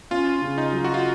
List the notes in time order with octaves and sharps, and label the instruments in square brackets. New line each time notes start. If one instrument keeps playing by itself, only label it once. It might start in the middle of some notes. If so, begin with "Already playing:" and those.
[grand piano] C#4 [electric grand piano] F4
[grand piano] C#3
[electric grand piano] D#4
[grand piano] F#3
[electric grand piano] F#4
F4